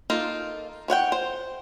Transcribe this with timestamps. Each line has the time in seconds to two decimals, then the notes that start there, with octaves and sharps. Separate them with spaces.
0.10 A#3 D#4 F4 A4
0.88 D#3 C#5 F#5 G5
1.12 C5